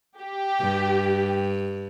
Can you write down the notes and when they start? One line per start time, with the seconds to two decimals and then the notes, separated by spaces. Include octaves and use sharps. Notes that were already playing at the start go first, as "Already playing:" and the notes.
0.20 G4
0.60 G2